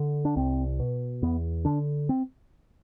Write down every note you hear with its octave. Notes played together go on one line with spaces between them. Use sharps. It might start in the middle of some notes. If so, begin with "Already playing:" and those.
Already playing: D3
D4
C2 C4
B2
E2 B3
D3 D4
C4